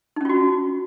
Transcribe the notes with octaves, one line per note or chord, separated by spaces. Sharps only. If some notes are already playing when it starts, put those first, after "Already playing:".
C#4 D#4 F4 F#4